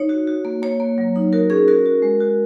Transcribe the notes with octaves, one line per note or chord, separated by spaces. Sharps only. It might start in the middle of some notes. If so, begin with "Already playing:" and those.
Already playing: D#4 C#5
F#4
F#4
A#3
A#3 C#5
A#3
F#3
D#4
F#4 A#4
C#4 G#4
F#4 A#4
F#4
G#3
F#4